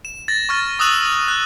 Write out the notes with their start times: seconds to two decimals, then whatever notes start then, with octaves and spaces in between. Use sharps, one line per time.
0.05 E7
0.28 A6 A#6
0.49 C#6 F6 A6
0.79 C#6 D#6 E6 F#6 E7 F#7
1.28 F#6